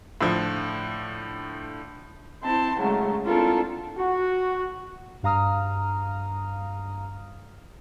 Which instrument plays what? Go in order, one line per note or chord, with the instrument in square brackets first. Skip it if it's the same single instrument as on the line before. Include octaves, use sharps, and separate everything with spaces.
[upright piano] A2 D3 F3
[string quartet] C4 E4 A5 C6
C#3 F#3 G#3 A3
C4 D4 E4 F4 A4 A#4
[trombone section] F#4
[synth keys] G2 F5 A#5 D#6 F6